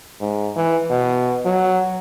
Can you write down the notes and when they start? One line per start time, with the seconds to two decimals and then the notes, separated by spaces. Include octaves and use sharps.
0.21 G#2
0.56 E3
0.90 B2
1.45 F#3